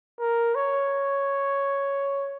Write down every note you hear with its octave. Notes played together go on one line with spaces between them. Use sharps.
A#4
C#5